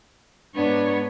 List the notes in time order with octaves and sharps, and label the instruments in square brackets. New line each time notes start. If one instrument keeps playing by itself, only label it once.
[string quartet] G#2 B3 C#5 [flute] D4